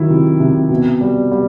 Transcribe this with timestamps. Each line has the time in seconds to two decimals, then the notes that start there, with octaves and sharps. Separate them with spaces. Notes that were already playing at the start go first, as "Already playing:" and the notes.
Already playing: D#3 F#3 E4
0.10 C3
0.40 C3
0.70 B2
1.01 G3
1.32 G3